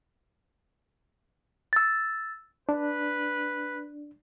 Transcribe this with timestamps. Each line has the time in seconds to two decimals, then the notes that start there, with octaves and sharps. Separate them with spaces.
1.73 E6 A6
2.69 D4 B4